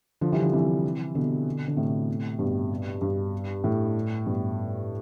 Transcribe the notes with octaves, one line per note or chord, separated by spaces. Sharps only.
D3 F3
E3 G3
D3 F3
C3 E3
B2 D3
D3
A2 C3
G2 B2
G2
A2
G2 B2